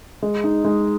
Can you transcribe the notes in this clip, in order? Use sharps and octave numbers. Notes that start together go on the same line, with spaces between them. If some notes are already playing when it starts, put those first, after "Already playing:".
G#3
D#4
G#3